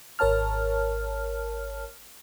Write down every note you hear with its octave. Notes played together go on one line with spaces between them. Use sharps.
G#1 A#4 C#5 A5 F6